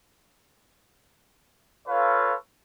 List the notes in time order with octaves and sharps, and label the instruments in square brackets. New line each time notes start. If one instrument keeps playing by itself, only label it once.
[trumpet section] F4 A4 B4 C#5 F5